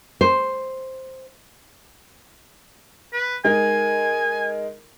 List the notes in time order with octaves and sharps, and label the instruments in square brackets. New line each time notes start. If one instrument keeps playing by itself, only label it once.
[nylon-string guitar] C5
[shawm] B4
[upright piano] G#3 D#4 A#4 [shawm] G#5